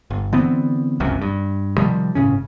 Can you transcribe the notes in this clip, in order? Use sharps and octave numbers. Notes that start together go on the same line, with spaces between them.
G1
D3 E3 B3 C4
G1 C#2 F#2 C3
G2
C3 D#3 F3 G3
G1 A2 C#3 C#4